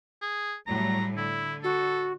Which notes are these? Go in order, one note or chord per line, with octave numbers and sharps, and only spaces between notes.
G#4
A2 F#3 G3 A#5
D3 E4
F#4 A4